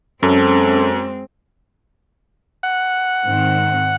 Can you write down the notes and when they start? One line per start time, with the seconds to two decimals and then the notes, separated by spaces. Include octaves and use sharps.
0.23 F#2 G#3 C4 C#4 A4
2.63 F#5
3.26 G#2 D#3 C4